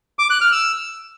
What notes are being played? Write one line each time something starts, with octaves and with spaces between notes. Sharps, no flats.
D6
F#6
F6
E6